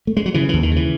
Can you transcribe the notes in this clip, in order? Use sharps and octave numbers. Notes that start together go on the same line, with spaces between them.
A3
G#3
F#3
C#3 E3
D#2 E3
D#3
C#3 E3